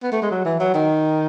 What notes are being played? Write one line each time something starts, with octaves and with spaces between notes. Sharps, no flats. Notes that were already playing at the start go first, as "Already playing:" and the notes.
B3
A3
G#3
F#3
E3
F#3
D#3